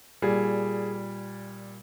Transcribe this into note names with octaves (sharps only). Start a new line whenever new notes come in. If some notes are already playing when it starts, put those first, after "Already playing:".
A#2 G3 G#4